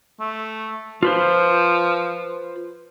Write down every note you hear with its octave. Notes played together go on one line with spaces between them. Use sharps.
A3
F3 F4 B4 C5